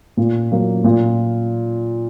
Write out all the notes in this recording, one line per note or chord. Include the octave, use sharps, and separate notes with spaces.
A#2
F#3 A#3
A#2